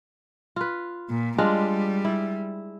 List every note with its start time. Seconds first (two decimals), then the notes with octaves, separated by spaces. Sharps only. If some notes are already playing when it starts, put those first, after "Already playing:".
0.56 F4 B4
1.10 A#2
1.38 G3 G#3 D4 F4
2.05 E4